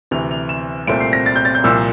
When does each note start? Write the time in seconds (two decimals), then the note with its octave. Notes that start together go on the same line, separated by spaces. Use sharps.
0.11 D2 C3 E3 F7
0.31 F7
0.49 E7
0.87 C2 A#2 A3 C4 D7
1.00 C7
1.13 A#6
1.26 A6
1.36 G6
1.45 A6
1.55 G6
1.64 C2 A#2 F3 E6